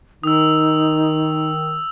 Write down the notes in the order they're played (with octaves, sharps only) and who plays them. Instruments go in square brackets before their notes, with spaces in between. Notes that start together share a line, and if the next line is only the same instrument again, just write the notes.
[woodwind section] D#3 [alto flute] D#4 [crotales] D#6 E6